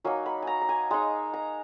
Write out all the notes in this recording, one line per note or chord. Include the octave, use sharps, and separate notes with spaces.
F#3 A#3 D#4 G#5
B5
G#5 A#5
A#5
G#5
G#3 D#4 A#5
A#5